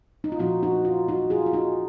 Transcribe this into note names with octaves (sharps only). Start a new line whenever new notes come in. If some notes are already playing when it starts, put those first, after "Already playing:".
D#4
F4
A#2 F3 C4 D#4 F#4
D#4 F#4
F4
D#4 F#4
F4 G#4
F4
D#4 F#4